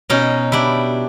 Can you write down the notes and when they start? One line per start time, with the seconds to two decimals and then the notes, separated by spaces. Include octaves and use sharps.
0.10 B2 C#4 D#4
0.52 G3 D4 E4